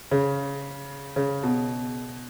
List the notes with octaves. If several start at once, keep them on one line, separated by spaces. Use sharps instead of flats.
C#3
C#3
B2